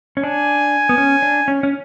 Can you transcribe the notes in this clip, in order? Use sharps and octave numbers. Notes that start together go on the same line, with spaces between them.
C#4
D4 G#5
B3
C#4
D4
C#4
C#4